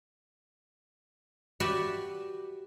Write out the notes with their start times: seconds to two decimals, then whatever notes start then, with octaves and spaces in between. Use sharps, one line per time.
1.60 F#4 G4 B4 D5 E5